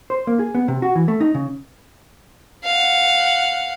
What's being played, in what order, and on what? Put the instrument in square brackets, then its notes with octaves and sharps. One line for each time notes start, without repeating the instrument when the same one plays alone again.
[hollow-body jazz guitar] C5
A#3
G#4
B3
C3
F#4
E3
A3
D#4
C#3
[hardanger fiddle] F5 F#5